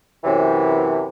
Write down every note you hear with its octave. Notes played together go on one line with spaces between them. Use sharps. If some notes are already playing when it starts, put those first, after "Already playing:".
F#2 C3 E3